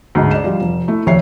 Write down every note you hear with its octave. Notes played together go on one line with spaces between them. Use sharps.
D2 G#2 G#3 C#4 D#5
D5 D#5 E7
F3 G3 D4 F4
F1
A3 E4
F1 A#1 D#2 C#5 E5 C7